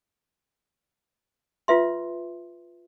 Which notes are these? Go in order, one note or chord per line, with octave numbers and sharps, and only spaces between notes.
F4 B4 E5 C6